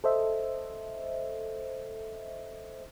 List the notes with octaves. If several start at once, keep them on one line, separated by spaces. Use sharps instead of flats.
A4 C5 D#5 E5